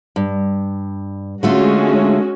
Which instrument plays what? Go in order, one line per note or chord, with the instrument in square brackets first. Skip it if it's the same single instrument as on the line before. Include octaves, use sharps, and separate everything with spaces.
[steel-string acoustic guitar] G2
[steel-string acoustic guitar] D3 A3 F4 [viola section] G#3 C#4 F#4